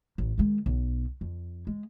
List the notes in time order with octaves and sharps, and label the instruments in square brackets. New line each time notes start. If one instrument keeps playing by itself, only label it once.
[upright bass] A1
D#3 G#3
B1
F2
G#3